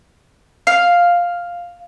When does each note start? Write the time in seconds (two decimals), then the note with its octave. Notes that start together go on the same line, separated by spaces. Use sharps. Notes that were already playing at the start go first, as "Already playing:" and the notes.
0.67 F5